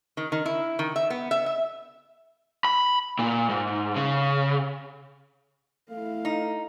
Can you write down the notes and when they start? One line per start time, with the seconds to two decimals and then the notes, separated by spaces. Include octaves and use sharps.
0.17 D#3
0.32 D#3
0.46 E4
0.79 D#3
0.96 E5
1.10 B3
1.31 E5
1.46 E5
2.65 B5
3.19 A#2
3.49 G#2
3.96 C#3
5.90 A3 E4 F5
6.25 D#4